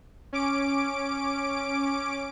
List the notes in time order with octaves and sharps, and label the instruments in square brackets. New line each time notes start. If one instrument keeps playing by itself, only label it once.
[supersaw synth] C#4 D6 D7